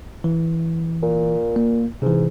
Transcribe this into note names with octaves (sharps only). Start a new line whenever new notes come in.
E3
A#2
A#3
G#2 C3 E3